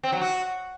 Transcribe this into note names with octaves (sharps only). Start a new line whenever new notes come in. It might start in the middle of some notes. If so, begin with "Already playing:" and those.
C4
F#3
F#4